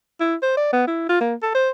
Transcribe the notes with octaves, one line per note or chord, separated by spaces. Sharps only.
E4
C5
D5
B3
E4
F4
A#3
A4
C5